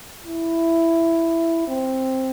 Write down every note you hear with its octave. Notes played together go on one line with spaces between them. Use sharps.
E4
C4